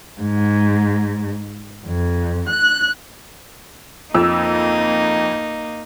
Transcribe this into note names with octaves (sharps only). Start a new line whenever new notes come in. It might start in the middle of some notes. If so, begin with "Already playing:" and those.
G#2
F2
F#6
F2 A#3 D#4 E6